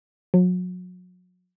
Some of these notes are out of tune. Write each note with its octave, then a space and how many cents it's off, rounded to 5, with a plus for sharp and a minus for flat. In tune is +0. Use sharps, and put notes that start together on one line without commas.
F#3 -35